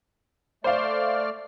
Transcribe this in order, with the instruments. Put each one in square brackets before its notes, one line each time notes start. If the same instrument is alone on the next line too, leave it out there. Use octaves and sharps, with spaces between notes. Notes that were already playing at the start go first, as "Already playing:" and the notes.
[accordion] A3 D5 F6 [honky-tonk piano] C5 F5